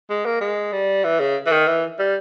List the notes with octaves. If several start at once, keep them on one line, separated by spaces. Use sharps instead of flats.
G#3
A#3
G#3
G3
E3
C#3
E3
D#3
E3
G3